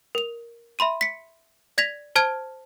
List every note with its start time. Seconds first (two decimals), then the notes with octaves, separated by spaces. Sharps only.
0.15 A#4 F7
0.79 E5 B5 C6 D#7
1.01 B6 C#7
1.78 D5 G#6 A#6 B6 F7
2.16 C5 A5 F6 G#6 D7